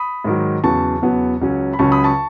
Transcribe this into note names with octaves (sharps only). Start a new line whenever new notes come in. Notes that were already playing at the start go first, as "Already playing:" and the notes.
Already playing: B5 D#6
G#2 D#3 F#3
E2 C#3 F#3 B3 A5 C#6
E2 C#3 F#3 B3
C#2 C#3 F#3 C#4
B5
C#2 C#3 F#3 C#4 A5 C#6
B5 D#6
A5 C#6